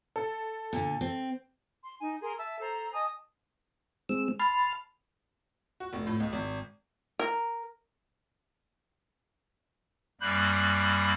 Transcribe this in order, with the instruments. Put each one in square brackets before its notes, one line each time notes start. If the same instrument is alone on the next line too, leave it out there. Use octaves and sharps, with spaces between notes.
[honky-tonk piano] A4
[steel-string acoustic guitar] A#2 D3
C4
[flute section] C6
D#4 G#5
G#4 A#4 C6
E5 A5 E6
A4 C5 A#5
D#5 G#5 A5 D#6
[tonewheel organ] G#3 C4 E6
[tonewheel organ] A5 C6 F6 [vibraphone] B5
[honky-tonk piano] F#4
F1
A2
C#2
G#1
[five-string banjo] A#4
[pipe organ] F#2 G3 A#3 B5 F#6 G6